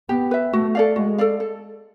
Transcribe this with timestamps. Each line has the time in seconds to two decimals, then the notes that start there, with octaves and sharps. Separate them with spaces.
0.09 B3 G4
0.31 B4 E5
0.53 A3 F#4
0.75 A4 D5 F5
0.96 G#3 F#4
1.18 A4 D5 F5
1.40 A4